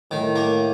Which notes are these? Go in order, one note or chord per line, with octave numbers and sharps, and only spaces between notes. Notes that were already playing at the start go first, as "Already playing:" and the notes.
A2 D#3
A#3